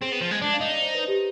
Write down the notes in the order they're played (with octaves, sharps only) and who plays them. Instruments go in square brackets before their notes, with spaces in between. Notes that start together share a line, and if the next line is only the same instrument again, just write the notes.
[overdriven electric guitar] C4 [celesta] G#4
[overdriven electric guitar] B3
F3
G#3
D4
[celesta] F5
[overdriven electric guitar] D#4 [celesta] D#5
[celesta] D5
C5
B4
G4